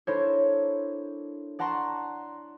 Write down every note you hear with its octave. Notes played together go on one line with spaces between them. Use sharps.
D4 E4 A4 A#4 C5 C#5
D5 F#5 A5 A#5 C6 C#6